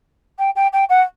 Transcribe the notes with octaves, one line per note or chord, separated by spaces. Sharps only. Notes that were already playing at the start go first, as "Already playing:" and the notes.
G5
G5
G5
F#5